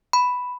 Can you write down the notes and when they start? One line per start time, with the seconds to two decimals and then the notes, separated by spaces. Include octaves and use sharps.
0.13 B5